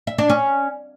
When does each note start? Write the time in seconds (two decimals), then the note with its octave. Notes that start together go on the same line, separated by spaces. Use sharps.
0.07 E5
0.18 D4
0.30 C#4